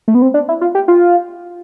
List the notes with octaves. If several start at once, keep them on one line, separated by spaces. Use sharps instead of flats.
A3
B3
C4
D4
E4
F4
G4
F4